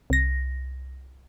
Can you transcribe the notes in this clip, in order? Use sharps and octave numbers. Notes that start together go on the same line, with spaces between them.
C2 A#6